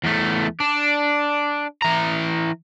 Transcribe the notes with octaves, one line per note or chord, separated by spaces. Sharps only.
E2 A3
D4
E3 A#5